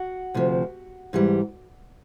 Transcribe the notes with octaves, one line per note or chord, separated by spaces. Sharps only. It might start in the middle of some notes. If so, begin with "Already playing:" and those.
Already playing: F#4
D2 C3 F3
G#2 E3 G3